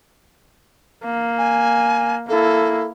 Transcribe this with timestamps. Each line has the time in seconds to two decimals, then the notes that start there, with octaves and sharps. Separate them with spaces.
1.04 A#3
1.38 G#5
2.29 A#3 E4 A4